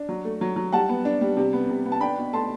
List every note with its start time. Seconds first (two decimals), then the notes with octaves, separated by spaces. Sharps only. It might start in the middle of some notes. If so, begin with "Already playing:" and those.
Already playing: D4
0.09 F#3
0.24 A3
0.41 F#3
0.56 F#3
0.72 G3 F#5 A5
0.89 B3
1.05 D4
1.21 G3
1.37 C3
1.53 B3
1.69 C3
1.86 B3
1.92 A5
2.01 D4 G5 B5
2.17 B2
2.33 A3 A5 C6